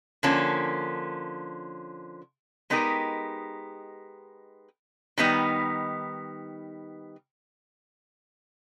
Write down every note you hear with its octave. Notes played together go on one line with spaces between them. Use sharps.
D3 F3 A#3 C#4
G#3 B3 D#4 G4 A#4
D#3 G3 B3 D#4